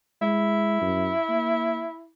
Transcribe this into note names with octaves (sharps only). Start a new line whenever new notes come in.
G#3 E4
F#2
A#3